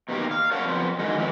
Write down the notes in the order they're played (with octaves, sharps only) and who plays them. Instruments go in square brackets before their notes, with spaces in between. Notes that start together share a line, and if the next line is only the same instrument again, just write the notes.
[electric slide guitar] B2 D#3 A#3 G4
F5
A#4 C#5 F5 F#5 A5
F2 B3 C5
D3 D#3 G#3 F#4 G#4
F2 E3 G#3